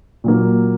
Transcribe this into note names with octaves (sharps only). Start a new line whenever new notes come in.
A#2 F#3 A#3